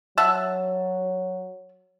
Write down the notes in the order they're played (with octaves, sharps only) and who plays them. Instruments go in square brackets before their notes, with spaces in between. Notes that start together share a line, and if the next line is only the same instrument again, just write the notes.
[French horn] F#3 [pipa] E5 F#5 A5